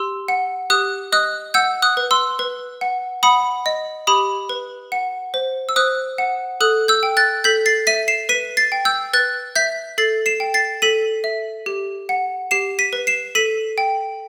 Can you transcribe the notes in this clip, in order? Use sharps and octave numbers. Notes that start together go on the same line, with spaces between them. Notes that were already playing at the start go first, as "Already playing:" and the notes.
Already playing: G4 C6 E6
F#5
G4 D#6 F#6
D#5 D#6 F#6
F#5 E6 G6
D#6 F#6
B4
C6 E6
B4
F#5
F#5 B5 D#6
D#5
G4 B5 D#6
B4
F#5
C5
E6
C5 D#6 F#6
F#5
A4 D#6 F#6
E6 G6
G5
F#6 A6
A4 G6 B6
A6 C7
E5 B6 D#7
C7 E7
B4 B6 D#7
A6 C7
G5
E6 G6
B4 F#6 A6
E5 G6 B6
A4 A6 C7
C7 E7
G5
A6 C7
A4 B6 D#7
E5
G4
F#5
G4 C7 E7
B6 D#7
B4
C7 E7
A4 B6 D#7
G5